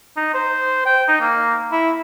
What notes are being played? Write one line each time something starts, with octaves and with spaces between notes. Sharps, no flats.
D#4
C5
G5
D#4
A#3
E4